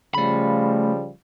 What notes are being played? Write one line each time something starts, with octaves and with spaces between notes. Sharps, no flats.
C#3 F3 G3 A3 B5